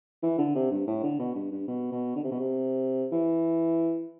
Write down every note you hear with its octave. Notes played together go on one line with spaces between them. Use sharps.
E3
D3
C3
G2
A2
D3
B2
G2
G2
B2
B2
D3
C3
B2
C3
E3